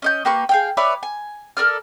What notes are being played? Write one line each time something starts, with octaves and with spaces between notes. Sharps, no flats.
C#4 D#5 G6
A#3 G4 B4 C#6
G#4 F5 G5
B4 C#5 D5 E5
G#5
A4 A#4 D5 F6